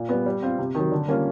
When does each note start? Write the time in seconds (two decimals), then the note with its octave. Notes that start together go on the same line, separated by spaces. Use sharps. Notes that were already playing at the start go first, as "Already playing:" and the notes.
Already playing: A#2
0.09 G3 B3
0.26 G3
0.42 C4 F4
0.59 C3
0.75 D#3 F#3
0.92 D3
1.08 G3 A#3 C#4 F4